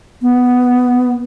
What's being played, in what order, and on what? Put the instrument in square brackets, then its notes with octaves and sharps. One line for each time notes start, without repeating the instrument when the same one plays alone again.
[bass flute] B3